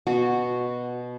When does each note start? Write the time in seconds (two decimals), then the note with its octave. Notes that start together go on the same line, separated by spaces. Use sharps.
0.07 B2 F#4